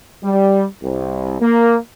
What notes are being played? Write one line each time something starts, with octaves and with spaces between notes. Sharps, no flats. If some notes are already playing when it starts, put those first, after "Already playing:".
G3
C2
A#3